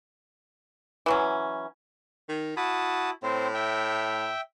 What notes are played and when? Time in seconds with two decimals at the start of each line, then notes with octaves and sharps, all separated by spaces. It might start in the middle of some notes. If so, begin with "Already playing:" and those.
1.06 E3 F#3 C#4
2.29 D#3
2.57 E4 F#4 A5 D#6
3.23 A2 C4 C5
3.54 E5 G5